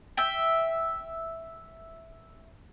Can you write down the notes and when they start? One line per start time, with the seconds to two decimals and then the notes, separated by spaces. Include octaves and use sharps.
0.17 E5 G5